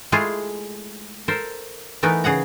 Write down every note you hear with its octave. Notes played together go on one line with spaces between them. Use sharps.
G#3 A3 E4 F4 G#4
A4 A#4 C5
E3 A3 B3 D#4 A#4 B4
C#3 G#4 F#5 A#5